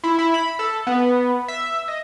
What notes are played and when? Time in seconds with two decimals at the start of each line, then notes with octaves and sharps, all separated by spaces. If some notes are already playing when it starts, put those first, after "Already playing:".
0.04 E4
0.19 E4
0.34 B5
0.59 A4
0.87 B3
1.48 E5
1.88 D#5